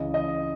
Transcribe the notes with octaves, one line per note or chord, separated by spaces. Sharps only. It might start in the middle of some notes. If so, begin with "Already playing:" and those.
Already playing: C#2 C#3 E3 D#5
D#5